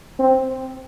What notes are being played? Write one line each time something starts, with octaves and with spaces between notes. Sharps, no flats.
C4